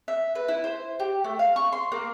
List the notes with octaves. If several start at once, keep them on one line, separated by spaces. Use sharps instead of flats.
E5
B4
E4
C5
G4
A3
F5
C#6
C6
A#3